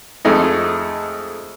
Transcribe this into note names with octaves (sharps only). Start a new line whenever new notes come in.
F2 G#3 A3 D#4